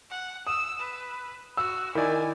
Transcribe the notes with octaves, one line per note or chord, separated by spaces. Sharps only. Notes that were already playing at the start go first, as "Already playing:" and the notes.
F#5
D#6 E6
B4
F#4 E6
D#3 E4 D5 G#5